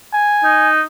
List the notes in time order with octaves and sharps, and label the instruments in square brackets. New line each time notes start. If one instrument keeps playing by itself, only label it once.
[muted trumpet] G#5
[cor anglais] D#4